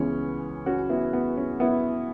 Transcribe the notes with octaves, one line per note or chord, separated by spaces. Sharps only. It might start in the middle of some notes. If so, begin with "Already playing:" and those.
Already playing: C#2 C#3 E3 B3 C#4
C#4 F#4
B3 E4
B3
C#4
B3 E4